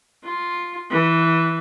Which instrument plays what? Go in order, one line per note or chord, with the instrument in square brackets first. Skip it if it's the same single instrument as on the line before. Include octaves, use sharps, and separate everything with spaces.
[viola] F4
E3